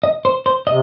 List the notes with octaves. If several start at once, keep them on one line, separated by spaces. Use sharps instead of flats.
D#5
C5
C5
C3 D#5